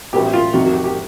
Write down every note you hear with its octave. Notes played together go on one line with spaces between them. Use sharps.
A1 A2 F#3 B3 G4
F4
F2 C3 D#3 F#4
F#4
G4
G4